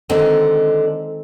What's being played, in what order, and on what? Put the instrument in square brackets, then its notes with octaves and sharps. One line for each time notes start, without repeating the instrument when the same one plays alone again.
[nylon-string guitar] D3 [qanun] D#3 G#3 C4